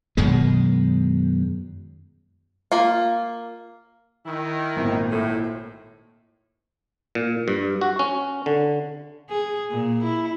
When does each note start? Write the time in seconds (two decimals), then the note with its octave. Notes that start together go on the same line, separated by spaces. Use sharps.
0.17 F#2 B2 D#3 G#3
2.72 A#3 F4
4.25 D#3 E4
4.77 G#1 A#2
5.10 A2
7.15 A#2
7.48 G2
7.81 F#4
7.99 C#4
8.46 D3
9.30 G#4
9.71 A#2
10.04 E4